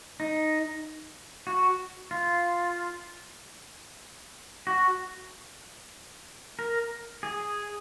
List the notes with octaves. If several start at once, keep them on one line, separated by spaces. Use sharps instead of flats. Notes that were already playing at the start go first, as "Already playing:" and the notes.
D#4
F#4
F4
F#4
A#4
G#4